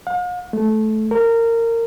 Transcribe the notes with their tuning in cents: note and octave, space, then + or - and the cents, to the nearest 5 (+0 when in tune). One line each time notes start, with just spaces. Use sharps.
F5 +45
A3 -20
A#4 -20